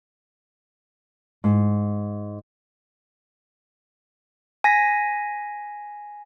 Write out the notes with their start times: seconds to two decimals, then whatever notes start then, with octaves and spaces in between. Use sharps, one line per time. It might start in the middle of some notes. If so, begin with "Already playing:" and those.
1.44 G#2
4.64 G#5 A#6 B6